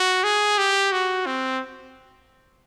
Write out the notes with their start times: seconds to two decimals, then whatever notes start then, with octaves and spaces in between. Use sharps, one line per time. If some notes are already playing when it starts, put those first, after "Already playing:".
Already playing: F#4
0.24 G#4
0.58 G4
0.92 F#4
1.26 C4